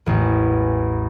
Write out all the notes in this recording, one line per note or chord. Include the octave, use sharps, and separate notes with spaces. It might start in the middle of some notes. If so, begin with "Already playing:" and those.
A1 E2